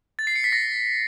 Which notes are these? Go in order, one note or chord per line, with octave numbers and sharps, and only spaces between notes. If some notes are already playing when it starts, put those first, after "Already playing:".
A6
C7
C#7
B6
A#6